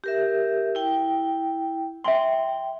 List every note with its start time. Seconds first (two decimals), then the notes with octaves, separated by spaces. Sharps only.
0.04 G4 A#4 E5
0.75 E4 G5
2.04 E5 G5 G#5 C6